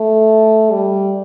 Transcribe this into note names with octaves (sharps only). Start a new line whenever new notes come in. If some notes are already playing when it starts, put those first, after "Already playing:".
Already playing: A3
G3